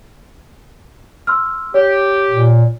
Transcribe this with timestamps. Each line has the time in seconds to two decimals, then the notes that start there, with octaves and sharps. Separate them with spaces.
1.27 C6 E6 F6
1.74 G4 C#5
2.30 A#2